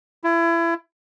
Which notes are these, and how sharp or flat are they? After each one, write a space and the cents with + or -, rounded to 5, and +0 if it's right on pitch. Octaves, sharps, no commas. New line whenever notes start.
E4 +30